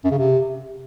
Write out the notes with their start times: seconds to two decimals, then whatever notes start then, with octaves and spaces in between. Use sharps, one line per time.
0.04 F#2
0.11 C#3
0.18 C3